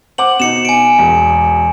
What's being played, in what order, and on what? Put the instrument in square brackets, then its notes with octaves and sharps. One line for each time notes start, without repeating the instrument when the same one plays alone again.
[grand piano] C5 F#5 D6 [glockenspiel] F#7
[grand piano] B2 D#4 [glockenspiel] C#7 E7
[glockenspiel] G#5 D7
[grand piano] E1